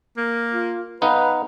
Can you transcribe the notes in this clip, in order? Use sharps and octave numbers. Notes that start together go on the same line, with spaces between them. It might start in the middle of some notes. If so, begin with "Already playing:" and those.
A#3
F4
B3 D#4 B4 F5